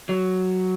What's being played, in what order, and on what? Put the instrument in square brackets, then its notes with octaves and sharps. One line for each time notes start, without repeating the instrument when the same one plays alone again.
[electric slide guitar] F#3